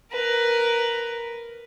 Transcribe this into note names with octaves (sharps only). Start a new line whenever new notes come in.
A#4 B4